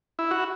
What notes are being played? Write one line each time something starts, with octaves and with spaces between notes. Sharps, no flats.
E4
F#4